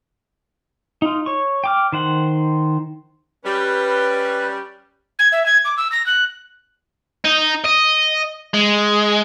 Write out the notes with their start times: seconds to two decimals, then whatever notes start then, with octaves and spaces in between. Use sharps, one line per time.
1.02 D#4 F4
1.26 C#5 C#6
1.64 G5 D6 F6
1.92 D#3 C5 F#5
3.44 G3 C#4 B4
5.19 G#6
5.32 E5
5.46 G#6
5.65 D6
5.77 E6
5.92 A#6
6.06 F#6
7.25 D#4
7.66 D#5
8.54 G#3